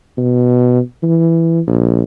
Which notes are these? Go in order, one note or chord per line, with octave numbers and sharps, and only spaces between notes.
B2
E3
A#1